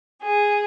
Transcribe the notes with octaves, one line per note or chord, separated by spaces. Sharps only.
G#4